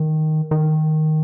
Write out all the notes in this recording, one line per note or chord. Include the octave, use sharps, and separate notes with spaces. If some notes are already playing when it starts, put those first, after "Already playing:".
Already playing: D#3
D#3